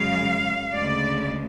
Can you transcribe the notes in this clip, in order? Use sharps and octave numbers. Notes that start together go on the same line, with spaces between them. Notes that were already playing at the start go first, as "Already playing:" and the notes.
Already playing: F#2 C#3 G#3 F5
D2 C#3 G#3 D5